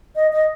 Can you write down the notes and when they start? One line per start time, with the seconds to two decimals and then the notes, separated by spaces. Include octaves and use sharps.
0.16 D#5
0.33 D#5